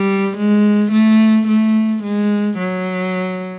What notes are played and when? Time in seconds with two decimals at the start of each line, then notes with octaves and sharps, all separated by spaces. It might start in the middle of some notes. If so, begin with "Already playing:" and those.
Already playing: G3
0.38 G#3
0.92 A3
1.47 A3
2.03 G#3
2.58 F#3